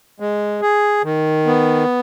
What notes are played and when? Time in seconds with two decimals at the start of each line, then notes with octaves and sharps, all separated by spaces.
0.20 G#3
0.61 G#4
1.04 D#3
1.46 B3